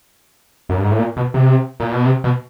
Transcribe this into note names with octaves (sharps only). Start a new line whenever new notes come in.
F#2
G2
G#2
A2
A#2
B2
C3
A#2
B2
C3
B2